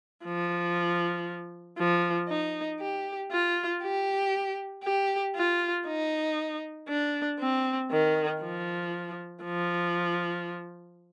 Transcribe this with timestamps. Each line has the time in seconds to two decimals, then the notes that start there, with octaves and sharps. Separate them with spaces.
0.24 F3
1.78 F3
2.28 D#4
2.80 G4
3.31 F4
3.82 G4
4.84 G4
5.35 F4
5.86 D#4
6.88 D4
7.39 C4
7.91 D#3
8.42 F3
9.44 F3